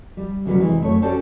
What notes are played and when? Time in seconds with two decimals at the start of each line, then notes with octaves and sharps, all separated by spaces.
0.17 G3
0.45 D2 C#3 F#3 G3 F#4 B4
0.59 C3 E3 G#3
0.80 F#2 A3 C#5
1.02 C#4 F#4 G4 A4 C5 D5